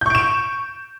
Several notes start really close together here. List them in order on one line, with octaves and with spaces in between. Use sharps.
G6 C#6 D7 E7